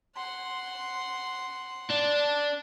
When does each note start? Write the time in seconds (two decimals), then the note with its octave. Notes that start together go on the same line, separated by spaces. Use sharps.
0.16 F#5 C6
1.91 D4